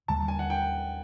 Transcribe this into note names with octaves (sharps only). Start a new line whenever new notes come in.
D#2 D3 G3 A5
G#5
F#5
G5